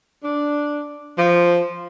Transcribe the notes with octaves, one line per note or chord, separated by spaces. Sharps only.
D4
F3